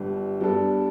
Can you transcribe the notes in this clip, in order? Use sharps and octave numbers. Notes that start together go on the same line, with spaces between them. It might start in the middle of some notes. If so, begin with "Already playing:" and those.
Already playing: G1 G2 G3 D4
G2 G3 B3 D4 A4